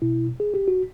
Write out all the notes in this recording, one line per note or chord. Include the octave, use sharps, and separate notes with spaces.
B2 E4
G#4
G4
F#4